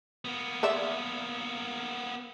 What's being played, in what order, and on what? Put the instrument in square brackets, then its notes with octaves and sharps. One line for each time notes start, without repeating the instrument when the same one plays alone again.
[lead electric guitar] A#3 B3
[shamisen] C5 D5 E5